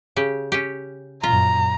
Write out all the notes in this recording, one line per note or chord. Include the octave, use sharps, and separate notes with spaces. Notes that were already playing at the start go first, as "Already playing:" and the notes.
C#3 G4
C#4 G4
F#2 A#2 F4 A#5